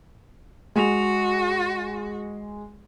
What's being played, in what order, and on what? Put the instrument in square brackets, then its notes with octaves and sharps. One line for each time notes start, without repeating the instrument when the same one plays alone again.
[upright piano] G#3 G#4 F7 [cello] F#4